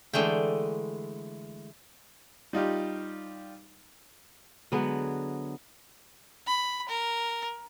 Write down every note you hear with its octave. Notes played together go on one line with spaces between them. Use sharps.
D3 E3 G#3 A3 G5
G3 D#4 F4 G4
D3 F#3 G#3 B3
B5
A#4